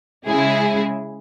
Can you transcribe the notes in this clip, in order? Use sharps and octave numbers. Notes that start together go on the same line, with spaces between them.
C#3 G#3 E4 G#4